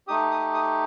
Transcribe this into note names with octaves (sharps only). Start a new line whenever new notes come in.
A3 D#4 G4 D#6
D#6
D#6